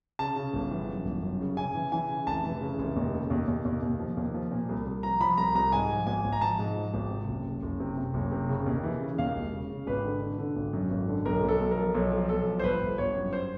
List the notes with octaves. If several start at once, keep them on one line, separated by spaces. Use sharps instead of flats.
C#3 A5
C#3
G1
E3
F#2
G1
F#2
C#3
C#3 G#5
E3
E3 G#5
C#3
F1 A5
E3
C#3
F1
D#2
C#3
D#2
D#2
D#2
D#2
F3
D#2
F3
A#2
C2
C2
F3 A#5
F3 B5
C2 A#5
C2 A#5
G#2 G#5
F3
G#1 G#5
G#1
A#5
F3 A5
G#2
F3
G#1
C3
F#1
F#1
F#1
C3
C3
F#1
C3
C#3
D#2
E3
C#3
D#2 F5
E1
C#3
C#3
G#1 B4
D3
D3
D3
G#1
F#2
G#1
D3
B1 A#4
B1
A4
B1
A#4
F3
B1 A4
F3
B1 A4
F3
C5
G1 B4
G1
G1 C#5
F#2
C5